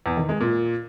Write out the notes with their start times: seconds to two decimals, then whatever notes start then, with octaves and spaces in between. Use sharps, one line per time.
0.06 E2
0.17 D#3
0.29 G#3
0.40 A#2